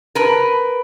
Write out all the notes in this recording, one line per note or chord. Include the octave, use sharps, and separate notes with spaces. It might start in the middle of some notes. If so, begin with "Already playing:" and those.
A#4 B4